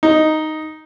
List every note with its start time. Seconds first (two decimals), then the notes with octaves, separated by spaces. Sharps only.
0.03 D#4